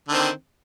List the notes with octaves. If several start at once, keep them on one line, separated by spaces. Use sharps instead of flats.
D3 D#3 C4